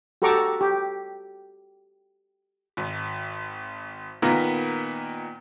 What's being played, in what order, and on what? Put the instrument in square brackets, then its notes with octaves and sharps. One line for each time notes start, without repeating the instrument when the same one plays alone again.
[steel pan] F#4 G4 A4 A#5 C#6 D6
G4
[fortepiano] G#1
A#2 D#3 A#3 B3 D#4